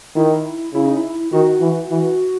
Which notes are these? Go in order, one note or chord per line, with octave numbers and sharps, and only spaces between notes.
D#3 E4
C#3 E4
D#4
E4
D#3 F#4
E3
E3